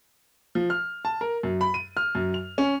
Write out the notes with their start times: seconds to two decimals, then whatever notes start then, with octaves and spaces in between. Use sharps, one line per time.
0.55 F3
0.70 F6
1.05 A5
1.21 A#4
1.43 F#2
1.61 B5
1.74 D#7
1.97 F6
2.15 F#2
2.34 F7
2.58 C#4